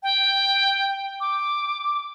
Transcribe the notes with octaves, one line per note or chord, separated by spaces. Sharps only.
G5
D6